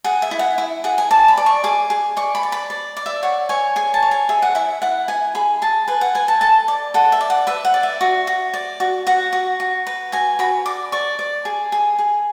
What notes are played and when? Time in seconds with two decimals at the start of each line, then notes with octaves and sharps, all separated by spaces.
0.04 G#4 F#5
0.22 E5
0.31 E4
0.39 F#5
0.58 E4
0.84 G#4 F#5
0.98 G#5
1.11 D5 A5
1.28 B5
1.37 D5
1.46 C#6
1.64 G#4 D6
1.90 G#4
2.17 D5 C#6
2.35 B5
2.43 D5
2.52 B5
2.70 D5
2.97 D5
3.06 E5
3.23 C#5 F#5
3.49 C#5 G#5
3.76 G#4 G#5
3.94 A5
4.02 C#5
4.11 G#5
4.29 G#4 E5
4.42 F#5
4.55 E4 E5
4.82 E4 F#5
5.08 E4 G#5
5.35 G#4 B5
5.62 G#4 A5
5.88 B4 G#5
6.01 F#5
6.15 B4 G#5
6.28 A5
6.41 A4 A5
6.68 D5
6.94 A4 F#5
7.12 E5
7.21 D5
7.30 F#5
7.47 B4 E5
7.65 F#5
7.74 D5
7.83 E5
8.01 F#4
8.27 F#4
8.54 D5
8.80 F#4
9.07 F#4 F#5
9.33 F#4
9.60 F#4
9.87 B4
10.12 F#4 G#5
10.39 F#4 B5
10.66 D5 D6
10.92 D5 C#6
11.19 D5
11.45 G#4
11.72 G#4
11.99 G#4